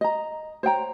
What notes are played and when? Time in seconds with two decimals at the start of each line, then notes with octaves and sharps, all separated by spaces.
0.01 D#5 A#5
0.63 C5 C#5 G5 A#5